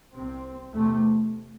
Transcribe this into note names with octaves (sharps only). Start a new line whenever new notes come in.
C2 C3 C4
E2 C3 A3